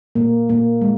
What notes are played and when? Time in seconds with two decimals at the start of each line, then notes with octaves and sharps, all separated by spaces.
0.15 A#2 A#3
0.49 A#2 A#3
0.82 G#3